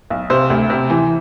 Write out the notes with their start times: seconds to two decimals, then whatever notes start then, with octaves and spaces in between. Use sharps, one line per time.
0.10 B1
0.30 C3 C5
0.50 D2
0.70 C3
0.90 E3